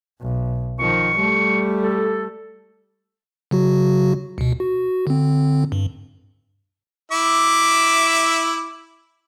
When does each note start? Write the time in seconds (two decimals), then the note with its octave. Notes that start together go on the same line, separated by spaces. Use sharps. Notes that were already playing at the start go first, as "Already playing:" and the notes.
0.21 B1
0.79 D#3 F3 C#6
1.16 G3 A3
1.83 A4
3.51 C#3 F#3 F#4
4.38 C#2 B2
4.60 F#4
5.07 D3 C4
5.72 G2
7.12 E4 E5 D6